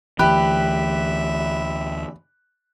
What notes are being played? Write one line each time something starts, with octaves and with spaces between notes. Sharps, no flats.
D2 E3 G4 E5 B5 F#6